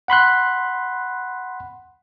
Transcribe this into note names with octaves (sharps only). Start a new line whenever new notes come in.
F#5 B5 C6 F#6